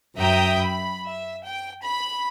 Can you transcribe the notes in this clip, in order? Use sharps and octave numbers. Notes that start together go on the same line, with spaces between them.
F#2 E5 G5 A#5 D#6 G6
B5
E5
G5
B5